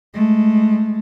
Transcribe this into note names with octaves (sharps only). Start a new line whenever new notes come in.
G#3 A3